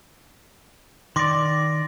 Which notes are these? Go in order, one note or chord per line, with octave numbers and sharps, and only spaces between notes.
D#3 D5 C6 D6 A#6